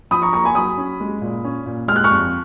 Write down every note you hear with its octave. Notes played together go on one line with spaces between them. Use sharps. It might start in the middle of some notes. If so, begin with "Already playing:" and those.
F3 B5 D#6
A#5 C#6
A#3 A#5 C#6
G#5 B5
F#3 B5 D#6
C#4
G#3
A#2
C#4
A#2
G#3 F6
F#6
C#6 F6
F2